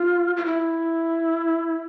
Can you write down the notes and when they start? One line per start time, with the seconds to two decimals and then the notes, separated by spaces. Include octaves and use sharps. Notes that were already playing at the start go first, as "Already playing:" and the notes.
Already playing: F4
0.37 F4
0.45 E4